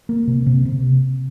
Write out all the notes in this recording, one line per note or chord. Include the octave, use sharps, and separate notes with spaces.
A#3
C3
C3
C3